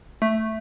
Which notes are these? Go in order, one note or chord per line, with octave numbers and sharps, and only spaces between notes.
A3